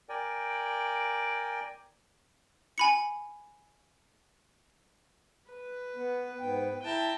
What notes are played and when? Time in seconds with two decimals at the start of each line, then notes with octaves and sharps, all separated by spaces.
0.09 A#4 D5 G5 G#5
2.78 G#5 B5 C#7
5.50 B4
5.95 B3
6.40 G#2 B3 G5
6.83 E4 G5 A5 A#5